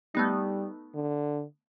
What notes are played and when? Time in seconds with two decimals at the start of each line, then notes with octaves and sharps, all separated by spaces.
0.15 G3 A3 B3 D#4
0.95 D3